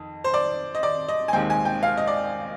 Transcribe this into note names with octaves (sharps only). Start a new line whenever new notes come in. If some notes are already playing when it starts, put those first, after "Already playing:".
Already playing: F2 D#3
C5
D5
D#5
D5
D#5
G#5
D#2 D#3 G#3 C4 G5
G#5
G5
F5
D#5
D5